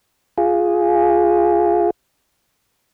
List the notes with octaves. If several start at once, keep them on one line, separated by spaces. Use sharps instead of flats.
F4 G#4